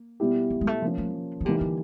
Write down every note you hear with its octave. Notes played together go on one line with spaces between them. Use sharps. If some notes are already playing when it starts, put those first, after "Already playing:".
Already playing: A#3
B2 G3 B3 E4 G4
A#3
G#3
A3
F3 A#3 C#4
A3
D#3
D#3
D3 E3 G3 A#3 D#4 G4
D3